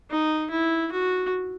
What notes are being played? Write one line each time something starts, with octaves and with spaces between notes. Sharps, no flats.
D#4
E4
F#4